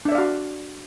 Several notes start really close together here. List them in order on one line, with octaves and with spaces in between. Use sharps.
D4 E5 D5 F5 F#4